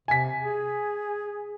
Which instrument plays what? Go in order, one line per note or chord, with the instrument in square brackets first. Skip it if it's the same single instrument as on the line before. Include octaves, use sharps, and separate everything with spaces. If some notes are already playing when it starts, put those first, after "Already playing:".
[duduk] C3 [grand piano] G#5 B6
[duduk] G#4